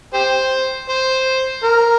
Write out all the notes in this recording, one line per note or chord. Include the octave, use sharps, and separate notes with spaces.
G4 C5
C5
A#4